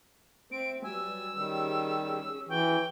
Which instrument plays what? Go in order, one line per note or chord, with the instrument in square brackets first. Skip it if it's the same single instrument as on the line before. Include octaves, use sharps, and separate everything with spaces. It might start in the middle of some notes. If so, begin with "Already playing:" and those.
[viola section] C4 E5 [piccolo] D7
[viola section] F#3 G3 B4 [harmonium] G#5 [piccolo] E6
[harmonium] D#3 G3 [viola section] C#4 G4 G#4
[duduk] E3 [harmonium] F#4 [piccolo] G5